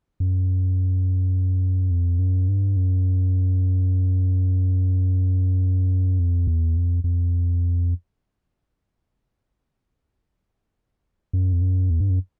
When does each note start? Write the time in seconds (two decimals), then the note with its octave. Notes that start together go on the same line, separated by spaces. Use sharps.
0.20 F#2
1.91 F2
2.19 F#2
2.48 G2
2.77 F#2
6.19 F2
6.47 E2
6.77 F2
7.04 F2
11.33 F#2
11.53 F2
11.61 F#2
11.90 E2
12.00 G2
12.10 F#2